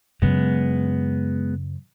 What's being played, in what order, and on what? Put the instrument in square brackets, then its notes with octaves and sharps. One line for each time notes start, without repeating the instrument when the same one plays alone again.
[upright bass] F#2 C#3 [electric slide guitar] G#3 B3